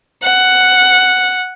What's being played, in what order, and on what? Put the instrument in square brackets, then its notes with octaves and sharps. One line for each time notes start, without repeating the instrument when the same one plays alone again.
[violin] F#5